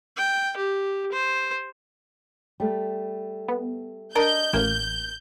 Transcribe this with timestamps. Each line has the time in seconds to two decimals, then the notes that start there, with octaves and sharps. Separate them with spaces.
0.16 G5
0.57 G4
1.12 C5
2.60 G3 A3
3.48 B3
4.15 D4 A#4 D#5 G6
4.53 A1 A#3